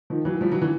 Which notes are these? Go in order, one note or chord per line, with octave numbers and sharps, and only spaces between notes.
D#3 F3
E3 F#3
F3 G3
E3 F#3
D3 E3